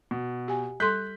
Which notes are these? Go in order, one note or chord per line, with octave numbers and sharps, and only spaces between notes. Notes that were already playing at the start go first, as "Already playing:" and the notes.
B2
G4 G#5
G3 A4 C6 F#6 G6 B6